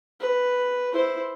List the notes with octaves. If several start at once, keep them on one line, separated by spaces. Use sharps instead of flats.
B4
E4 C5